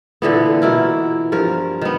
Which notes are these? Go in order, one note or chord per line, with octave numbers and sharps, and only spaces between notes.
A#2 D3 E3 B3
B2 E4 A#4
G2 F3 A#4
D#3 B3